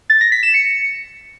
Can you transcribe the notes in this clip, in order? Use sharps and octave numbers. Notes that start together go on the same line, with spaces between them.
A6
A#6
B6
E7
C#7